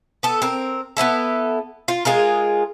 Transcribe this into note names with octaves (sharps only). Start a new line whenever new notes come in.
B3 A4
C4 A#4
B3 C4 E4 A4
F4
G#3 F4 G#4 A#4